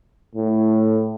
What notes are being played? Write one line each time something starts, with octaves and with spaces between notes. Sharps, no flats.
A2